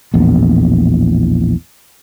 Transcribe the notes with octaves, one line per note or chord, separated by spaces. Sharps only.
A#1 E2 A2